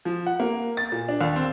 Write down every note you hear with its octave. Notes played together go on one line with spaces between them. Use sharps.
F3
F#5
A#3
A6
A#2
D4
D#2
C4